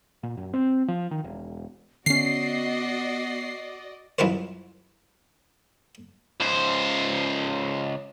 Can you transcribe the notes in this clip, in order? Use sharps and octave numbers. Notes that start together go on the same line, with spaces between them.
A#2
F#2
C4
F3
D#3
E1
D3 B3 C#4 F#4 D5 D#5 C7
C2 F#2 E4 F4 B4 C5
C#2 C5